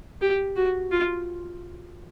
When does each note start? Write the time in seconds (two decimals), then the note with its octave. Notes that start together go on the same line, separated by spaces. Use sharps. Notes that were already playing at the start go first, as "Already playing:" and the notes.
0.21 G4
0.56 F#4
0.92 F4